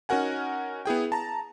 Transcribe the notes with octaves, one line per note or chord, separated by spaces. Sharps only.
C#4 D#4 F#4 A#4 F#5 G#5
B3 E4 G#4 G5
A5 A#5